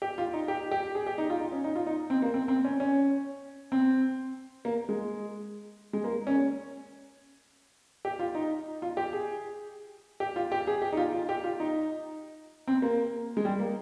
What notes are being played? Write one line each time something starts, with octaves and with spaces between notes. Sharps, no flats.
G4
F4
D#4
G4
G4
G#4
G4
D#4
F4
D#4
C#4
D#4
F4
D#4
C4
A#3
C4
C4
C#4
C#4
C4
A#3
G#3
G#3
A#3
C#4
G4
F4
D#4
F4
G4
G#4
G4
F4
G4
G#4
G4
D#4
F4
F4
G4
F4
D#4
C4
A#3
G#3
G3
A#3